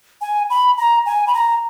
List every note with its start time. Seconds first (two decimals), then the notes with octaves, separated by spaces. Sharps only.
0.21 G#5
0.50 B5
0.77 A#5
1.06 G#5
1.27 B5
1.34 A#5